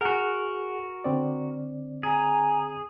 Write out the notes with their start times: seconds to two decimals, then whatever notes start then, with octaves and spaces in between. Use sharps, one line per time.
0.01 F#4 G#4 A#4 F#5
1.04 D3 C4 D5
2.03 G#4 G#5 A#5